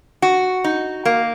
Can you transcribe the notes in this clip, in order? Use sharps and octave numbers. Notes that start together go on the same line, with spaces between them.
F#4
D#4
A#3